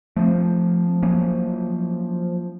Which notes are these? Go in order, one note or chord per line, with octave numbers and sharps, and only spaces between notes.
F3 A3 B3 C4
F#3 A#3 C#4